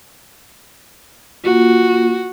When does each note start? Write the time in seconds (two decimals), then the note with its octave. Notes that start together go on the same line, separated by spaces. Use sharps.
1.44 A#3 F4 F#4